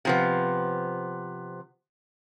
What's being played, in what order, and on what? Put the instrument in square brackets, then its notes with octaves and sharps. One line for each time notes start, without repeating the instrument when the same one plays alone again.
[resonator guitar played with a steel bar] C3 F3 B3